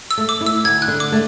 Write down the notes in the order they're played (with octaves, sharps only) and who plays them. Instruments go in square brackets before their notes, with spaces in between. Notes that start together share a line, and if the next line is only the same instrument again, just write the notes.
[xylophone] E6
[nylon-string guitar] A3
[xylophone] D6
[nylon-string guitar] E4
[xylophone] E6
[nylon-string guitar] D2 [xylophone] G#6
[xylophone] F#6
[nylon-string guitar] D3
[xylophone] D6
[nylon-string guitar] A3